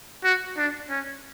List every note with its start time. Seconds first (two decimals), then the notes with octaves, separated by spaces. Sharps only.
0.24 F#4
0.57 D4
0.90 C#4